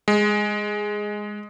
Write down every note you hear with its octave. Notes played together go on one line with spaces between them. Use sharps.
G#3